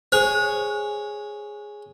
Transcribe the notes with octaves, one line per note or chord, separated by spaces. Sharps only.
G#4 C5 C#5